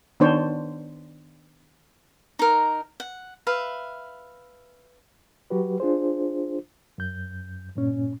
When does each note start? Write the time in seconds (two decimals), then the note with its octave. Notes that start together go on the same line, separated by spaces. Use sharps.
0.20 D#3 B3 D4 C5 C#5
2.39 D#4 A#4
3.00 F#5
3.47 B4 E5 F5
5.50 F#3 F#4 G4 B4
5.80 D4 F4 G#4 C5
6.98 F#2 G6
7.76 G2 A#2 C#4